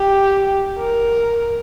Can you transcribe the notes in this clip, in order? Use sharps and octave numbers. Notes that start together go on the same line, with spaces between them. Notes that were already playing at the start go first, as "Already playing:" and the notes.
Already playing: G4
A#4